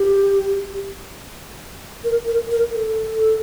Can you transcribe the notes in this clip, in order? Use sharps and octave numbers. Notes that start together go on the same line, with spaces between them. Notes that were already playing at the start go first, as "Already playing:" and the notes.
Already playing: G4
A#4
A#4
A#4
A4